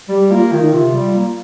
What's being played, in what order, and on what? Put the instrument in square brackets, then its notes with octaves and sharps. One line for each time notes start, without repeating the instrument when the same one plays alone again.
[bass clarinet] G3 [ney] G4
[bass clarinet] A#3 [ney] F4
[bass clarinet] D#3 [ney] F4
[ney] D#4
[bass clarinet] C3 [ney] F4
[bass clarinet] G3
A#3